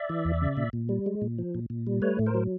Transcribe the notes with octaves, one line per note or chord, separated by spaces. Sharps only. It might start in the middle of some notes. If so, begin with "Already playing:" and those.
Already playing: D5 E5
E3
E2
C#3
A#2
A#2
G3
G#3
A#2
F3
A#2
A#2
G3
A3 B4 C#5
A2
A#4 C5
F#3